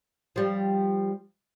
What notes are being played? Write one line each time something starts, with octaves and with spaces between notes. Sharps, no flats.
F3 G3